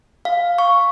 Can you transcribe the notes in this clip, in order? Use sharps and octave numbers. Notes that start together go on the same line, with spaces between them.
F5
C#6